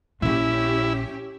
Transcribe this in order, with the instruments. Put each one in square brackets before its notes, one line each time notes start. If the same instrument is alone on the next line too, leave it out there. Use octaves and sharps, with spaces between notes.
[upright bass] A#1 A#2 [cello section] C#4 G4 [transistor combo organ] E4